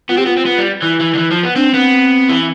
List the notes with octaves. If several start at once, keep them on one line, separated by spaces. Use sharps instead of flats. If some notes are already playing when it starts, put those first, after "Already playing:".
B3 F4
C4 G4
B3 F4
C4
B3
G3
E3 E4
E3
D3
E3
F3
B3
C4 D4
B3 C4
E3